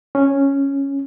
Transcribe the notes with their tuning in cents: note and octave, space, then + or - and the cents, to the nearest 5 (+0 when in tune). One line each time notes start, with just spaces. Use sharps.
C#4 -5